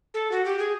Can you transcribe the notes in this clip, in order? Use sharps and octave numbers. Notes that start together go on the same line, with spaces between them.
A4
F#4
G4
G#4